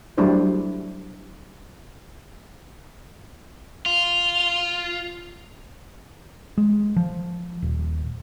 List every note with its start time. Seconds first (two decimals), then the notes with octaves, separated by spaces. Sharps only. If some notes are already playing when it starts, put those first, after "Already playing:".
0.18 F#3 G3 A3 D4 E4 C5
3.86 F4
6.58 G#3
6.96 F3
7.62 D#1